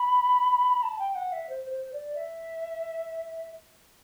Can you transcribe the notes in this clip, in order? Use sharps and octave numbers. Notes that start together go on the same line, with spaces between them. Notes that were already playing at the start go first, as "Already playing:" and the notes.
Already playing: B5
A5
G5
F#5
E5
C5
C5
D5
E5